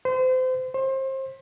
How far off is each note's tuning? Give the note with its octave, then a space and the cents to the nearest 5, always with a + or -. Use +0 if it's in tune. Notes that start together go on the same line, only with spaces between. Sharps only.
C5 -30
C5 +30